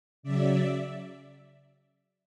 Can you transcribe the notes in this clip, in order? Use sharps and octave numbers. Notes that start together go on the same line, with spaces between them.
C#3 F#3 D5 E5